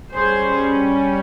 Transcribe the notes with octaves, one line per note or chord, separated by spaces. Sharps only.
G3 C#4 G#4 C5